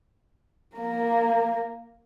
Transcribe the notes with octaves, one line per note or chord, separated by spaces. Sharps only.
A#3 A#4